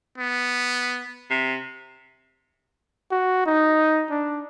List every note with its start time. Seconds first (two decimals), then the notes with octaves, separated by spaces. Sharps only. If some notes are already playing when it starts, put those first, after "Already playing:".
0.18 B3
1.30 C3
3.11 F#4
3.46 D#4
4.10 D4